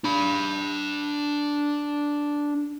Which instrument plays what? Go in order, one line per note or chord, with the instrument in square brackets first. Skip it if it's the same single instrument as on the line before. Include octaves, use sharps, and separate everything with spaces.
[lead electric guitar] D4 B5